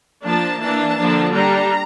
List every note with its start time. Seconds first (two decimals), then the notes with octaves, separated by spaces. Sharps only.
0.24 F3 A#3 D4 A5
0.60 E3 A#3 D4 A5
0.97 D3 F3 A#3 D4
1.33 G3 D4 A#5